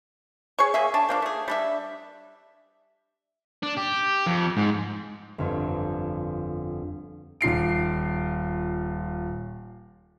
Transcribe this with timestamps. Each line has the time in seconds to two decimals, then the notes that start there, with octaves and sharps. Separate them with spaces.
0.59 G#4 C#5 C#6
0.74 A#3 G#4 E5
0.94 D4 A5
1.09 F3 A#3 D4
1.22 A3 G#4
1.48 G3 D4 E5
3.63 D4
3.77 G4
4.26 F2
4.57 G#2
5.38 G1 F2
7.41 D#1 F4 C7 D7